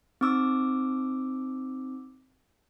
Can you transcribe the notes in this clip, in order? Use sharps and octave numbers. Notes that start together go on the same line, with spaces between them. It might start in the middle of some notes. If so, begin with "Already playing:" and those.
C4 D#4 D6 E6